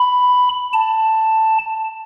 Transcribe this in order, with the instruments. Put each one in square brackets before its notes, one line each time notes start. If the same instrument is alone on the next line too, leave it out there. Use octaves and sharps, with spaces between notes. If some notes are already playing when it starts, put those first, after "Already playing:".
Already playing: [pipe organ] B5
A5